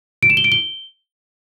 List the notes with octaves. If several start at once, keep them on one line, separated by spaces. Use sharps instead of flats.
D7
E7
G7
D7
G7